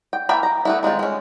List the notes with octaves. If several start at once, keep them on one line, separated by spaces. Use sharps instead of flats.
G5
E3 A#3 E5 G5 B5
A#5
A3 B3 E4
D#3 G#3 C4 F4
G#3 C#4